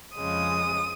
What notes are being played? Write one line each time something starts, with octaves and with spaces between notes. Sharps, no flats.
F2 C#3 G#3 D#6